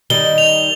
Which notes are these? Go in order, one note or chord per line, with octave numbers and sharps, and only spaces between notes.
D#3 G3 G7
F7